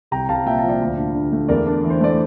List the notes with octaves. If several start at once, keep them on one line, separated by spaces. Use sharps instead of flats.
C2 G5 A#5
C2 F5 A5
A#2 E5 G5
F5 A5
F3
D5 F5
D2
D4
D3
A3
E2 A#4 D5
D4
E3
C5
A3 D5